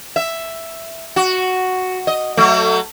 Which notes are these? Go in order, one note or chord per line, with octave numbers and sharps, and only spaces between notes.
E5
F#4
D#5
F#3 A3